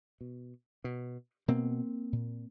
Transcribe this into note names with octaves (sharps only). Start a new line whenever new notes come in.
B2
B2
B2 A#3 C4
A#2